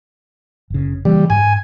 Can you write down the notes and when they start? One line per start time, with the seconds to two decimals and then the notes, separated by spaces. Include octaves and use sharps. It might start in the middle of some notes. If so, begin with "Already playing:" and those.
0.70 F#1 C#3
1.05 C#3 E3 G3 A#3
1.30 G#2 G#5